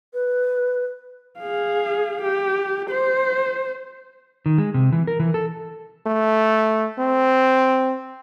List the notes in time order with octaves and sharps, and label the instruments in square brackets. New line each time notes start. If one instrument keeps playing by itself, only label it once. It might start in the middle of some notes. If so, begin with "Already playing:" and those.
[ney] B4
[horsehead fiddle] G#4 F5
G4
C5
[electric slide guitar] D#3
G#3
C3
E3
A#4
E3
A4
[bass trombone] A3
C4